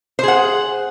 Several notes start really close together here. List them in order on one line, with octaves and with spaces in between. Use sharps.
C5 G#4 F#5